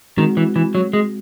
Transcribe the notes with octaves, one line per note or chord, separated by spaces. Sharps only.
D#3 G#3 C4 F#4
E3
E3
F#3
G#3